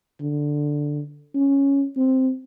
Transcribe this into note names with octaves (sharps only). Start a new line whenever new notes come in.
D3
C#4
C4